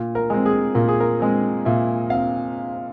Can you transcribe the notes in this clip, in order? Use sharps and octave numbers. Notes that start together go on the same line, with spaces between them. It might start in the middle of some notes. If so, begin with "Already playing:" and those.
Already playing: A#2
A#4
G#3 C4
G#4
A#2 A#4
G#4
A#4
G#3 C4
A#2 E5
C4 F5